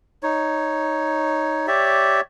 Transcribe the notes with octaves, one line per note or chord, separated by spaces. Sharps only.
D#4 C#5
G4 C#5 D5 E5